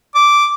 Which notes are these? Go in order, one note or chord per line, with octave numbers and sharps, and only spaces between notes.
D6